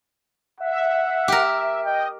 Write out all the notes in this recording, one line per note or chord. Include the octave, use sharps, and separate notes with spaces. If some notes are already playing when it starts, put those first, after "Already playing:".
E5 F#5
G4 A#4
D#5 G5